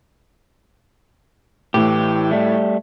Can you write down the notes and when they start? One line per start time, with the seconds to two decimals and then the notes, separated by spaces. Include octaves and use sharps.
1.74 A2 E3 G4
2.31 G3 A3